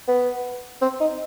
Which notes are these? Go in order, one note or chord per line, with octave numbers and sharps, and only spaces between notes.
B3
C4
D#4